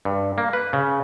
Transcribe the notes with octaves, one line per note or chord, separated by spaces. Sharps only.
G2
A#3
B4
C#3